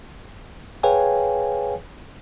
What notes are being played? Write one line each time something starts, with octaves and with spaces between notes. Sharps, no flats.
G#4 B4 C#5 F5 G5 G#5